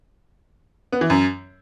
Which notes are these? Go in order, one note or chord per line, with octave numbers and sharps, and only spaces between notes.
B3
E3
F#2